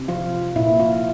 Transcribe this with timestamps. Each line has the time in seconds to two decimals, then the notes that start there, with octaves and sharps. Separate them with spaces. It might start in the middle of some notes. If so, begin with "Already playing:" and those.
Already playing: C3
0.08 F3 F4
0.56 A#2 E4
0.79 F4